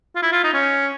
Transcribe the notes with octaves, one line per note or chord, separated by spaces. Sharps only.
F4
E4
F4
D#4
C#4